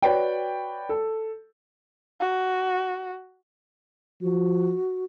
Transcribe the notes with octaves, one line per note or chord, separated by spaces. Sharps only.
F#4 B4 C#5 D5 G5
A4
F#4
F3 F#4